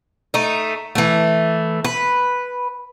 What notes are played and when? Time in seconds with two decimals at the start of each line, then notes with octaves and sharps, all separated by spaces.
0.34 A3 D#4
0.95 E3 A3
1.84 B4